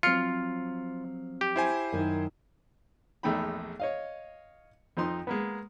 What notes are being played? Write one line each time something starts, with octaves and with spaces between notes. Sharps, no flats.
F3 F#3 C4 F4 F6 C7 C#7
G4
E4 C5 G#5
F#2 D#3
A#1 E2 A3 D#4 G5 B5
C#5 D#5 F5
F2 F3 D#4 C6
G#3 A#3 B3